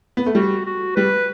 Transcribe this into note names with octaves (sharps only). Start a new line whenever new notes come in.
B3
A3
G3 F#4
F#4
G3 B4